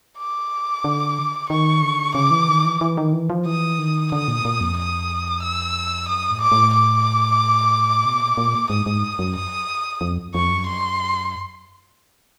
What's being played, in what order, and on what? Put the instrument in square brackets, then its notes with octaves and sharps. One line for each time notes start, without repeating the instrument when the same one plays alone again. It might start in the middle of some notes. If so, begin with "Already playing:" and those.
[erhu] D6
[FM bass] D3
[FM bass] D#3 [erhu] C#6
[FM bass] D3
[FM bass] C#3 [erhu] D6
[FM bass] E3
D#3
E3
E3
D#3
E3
F3
[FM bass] E3 [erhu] D#6
[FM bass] D#3
[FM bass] D3 [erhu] D#6
[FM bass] A#2
A#2
F2
[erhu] D#6
E6
[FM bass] F#2 [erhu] D#6
[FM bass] A2
[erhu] D6
[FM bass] A2
[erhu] D6
[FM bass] B2
A#2
A#2
[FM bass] G#2 [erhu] D#6
[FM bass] G#2
F#2
[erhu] D#6
[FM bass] F2
[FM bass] F2 [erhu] C#6
[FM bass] F#2
[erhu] C6